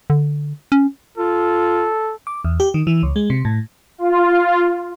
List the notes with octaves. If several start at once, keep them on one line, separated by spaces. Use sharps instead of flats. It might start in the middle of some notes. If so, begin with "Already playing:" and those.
D3
C#4
F4 A4
D6
E2
G4
D#3
E3
C#2
G#3
C3
A2
F4